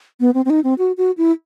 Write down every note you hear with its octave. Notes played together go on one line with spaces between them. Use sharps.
B3
C4
C4
D#4
C4
F#4
F#4
E4